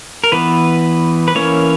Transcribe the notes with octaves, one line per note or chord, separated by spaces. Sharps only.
A#4
E3 B3 B4
B4
E3 A#3 C#4 C#5